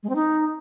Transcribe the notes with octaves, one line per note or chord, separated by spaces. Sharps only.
G#3
C4
D#4